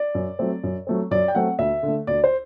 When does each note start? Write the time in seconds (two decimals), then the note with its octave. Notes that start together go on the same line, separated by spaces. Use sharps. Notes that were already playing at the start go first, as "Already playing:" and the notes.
Already playing: D5
0.15 F#2
0.39 F#3 A3 C4
0.64 F#2
0.87 F#3 A3 C4
1.11 F#2 D5
1.28 G5
1.35 F#3 A3 C4 F#5
1.59 D2 E5
1.83 D3
1.88 A3
2.07 D2 D5
2.24 C5